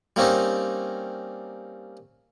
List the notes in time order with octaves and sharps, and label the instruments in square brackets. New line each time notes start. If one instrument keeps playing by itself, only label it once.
[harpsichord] G3 A#3 C4 C#4 D#4